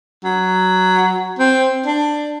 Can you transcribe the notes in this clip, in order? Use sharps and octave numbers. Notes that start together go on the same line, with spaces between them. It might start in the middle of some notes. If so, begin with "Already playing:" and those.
F#3
C4
D4